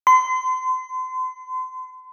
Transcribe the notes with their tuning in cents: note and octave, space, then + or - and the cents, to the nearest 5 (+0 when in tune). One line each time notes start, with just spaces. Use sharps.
C6 -35